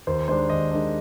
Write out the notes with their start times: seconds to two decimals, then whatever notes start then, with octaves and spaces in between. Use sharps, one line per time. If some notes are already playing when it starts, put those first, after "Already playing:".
0.07 D#2 C5
0.28 D#3 G#3 D4 C5
0.50 D#2 D#5
0.71 D#3 G#3 D4